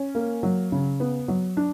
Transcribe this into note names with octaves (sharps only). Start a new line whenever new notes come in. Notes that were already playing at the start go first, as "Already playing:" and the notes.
Already playing: C#4
A#3
F#3
C#3
B3
F#3
D4